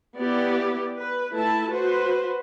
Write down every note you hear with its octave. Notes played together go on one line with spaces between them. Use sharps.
B3 E4 G4 D5
B4
A3 E4 A5
F#4 B4 C5